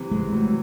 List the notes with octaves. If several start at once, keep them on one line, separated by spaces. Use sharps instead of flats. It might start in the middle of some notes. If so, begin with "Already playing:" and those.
Already playing: C3 E3
G#3
F#3 A3